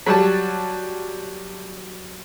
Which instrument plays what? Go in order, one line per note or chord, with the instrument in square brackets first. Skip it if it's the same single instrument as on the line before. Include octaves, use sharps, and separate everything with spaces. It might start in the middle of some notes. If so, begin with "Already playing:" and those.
[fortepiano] F#3 G3 A5